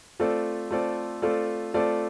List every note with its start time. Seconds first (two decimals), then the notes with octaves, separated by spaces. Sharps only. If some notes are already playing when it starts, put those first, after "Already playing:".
0.20 A3 C4 F4 A4 D5
0.71 A3 C4 F4 A4 D5
1.22 A3 C4 F4 A4 D5
1.74 A3 C4 F4 A4 D5